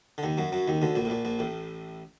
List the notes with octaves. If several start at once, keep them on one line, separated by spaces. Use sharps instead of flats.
D3
D#2 D#3
F#2 F#3
F#2 F#3
D#2 D#3
D2 D3
A#1 A#2
A2
A#1 A#2
A#1 A#2
A1 A2